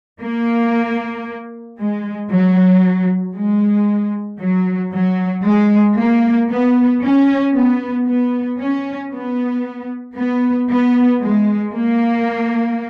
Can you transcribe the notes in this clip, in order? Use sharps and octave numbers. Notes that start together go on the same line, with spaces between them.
A#3
G#3
F#3
G#3
F#3
F#3
G#3
A#3
B3
C#4
B3
B3
C#4
B3
B3
B3
G#3
A#3